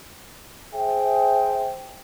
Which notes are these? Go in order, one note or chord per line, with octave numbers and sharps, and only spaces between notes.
G#4 C5 E5 G5